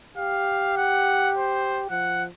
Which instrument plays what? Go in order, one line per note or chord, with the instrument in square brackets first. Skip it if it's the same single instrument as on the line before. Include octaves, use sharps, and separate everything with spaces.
[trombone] G4 [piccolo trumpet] F5
[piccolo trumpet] F#5
C5
[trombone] F3 [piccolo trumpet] F#5